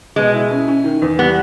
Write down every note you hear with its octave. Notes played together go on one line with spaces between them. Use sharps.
B2 G#3
E4
C#4
C#4
D#3
E2
G3 B3